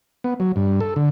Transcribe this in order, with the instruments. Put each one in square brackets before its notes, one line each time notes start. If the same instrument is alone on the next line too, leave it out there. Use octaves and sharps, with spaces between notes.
[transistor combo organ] B3
F#3
G2
A4
D3